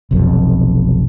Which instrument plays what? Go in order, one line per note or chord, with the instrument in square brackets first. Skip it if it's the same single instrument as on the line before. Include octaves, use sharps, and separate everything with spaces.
[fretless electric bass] F1 B1 F2